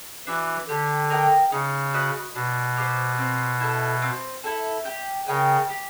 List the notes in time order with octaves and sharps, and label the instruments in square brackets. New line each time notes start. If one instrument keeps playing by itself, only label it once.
[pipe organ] E3 [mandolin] D4 F#4
[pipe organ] D3 [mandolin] G4
[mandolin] A#4 D#5 G5
[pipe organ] C#3 [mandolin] D#4
[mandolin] F#4 B4 D#5
[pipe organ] B2 [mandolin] D4
[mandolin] G4 C5 D#5
C4
E4 A4
C4
E4 A4
G4
[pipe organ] C#3 [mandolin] A#4 D#5 G5
[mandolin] G4